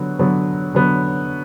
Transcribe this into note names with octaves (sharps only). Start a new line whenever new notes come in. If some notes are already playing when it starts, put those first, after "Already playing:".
Already playing: D3 F#3 B3
D3 F#3 B3
D3 F#3 B3